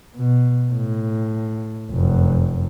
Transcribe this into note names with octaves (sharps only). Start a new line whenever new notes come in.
B2
A2
F1 F#2